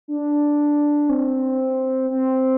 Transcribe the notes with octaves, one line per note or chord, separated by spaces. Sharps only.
D4
C4
C4